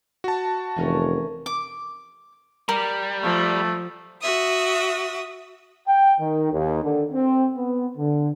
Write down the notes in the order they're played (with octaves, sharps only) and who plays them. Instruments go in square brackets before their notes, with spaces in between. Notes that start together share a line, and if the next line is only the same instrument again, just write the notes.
[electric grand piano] F#4 A5
[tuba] F1 [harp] E3 C#4 A#4
[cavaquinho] D6
[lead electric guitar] G3 [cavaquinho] A#4
[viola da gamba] F3 [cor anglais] A3
[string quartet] F#4 E5 D#6
[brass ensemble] G5
D#3
D#2
D3
C4
B3
D3